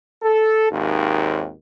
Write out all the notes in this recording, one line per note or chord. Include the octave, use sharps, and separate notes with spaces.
A4
G#1 D#2